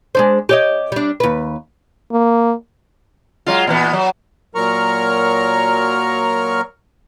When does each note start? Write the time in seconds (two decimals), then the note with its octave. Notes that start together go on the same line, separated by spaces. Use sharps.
0.15 G#3 D4 C5
0.49 G4 C#5 D#5
0.92 G3 D4
1.20 D#2 B4
2.12 A#3
3.47 F#3 G#3 F4
3.67 A#2 E3 B3
3.93 F#3
4.55 A#2 F#3 A#4 A#5 C#6 F6